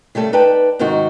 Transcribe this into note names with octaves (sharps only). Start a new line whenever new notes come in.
C#3 G3 A3 A4
D#4 B4 D5 G5 A5
G#2 C3 D#3 D#4 F#4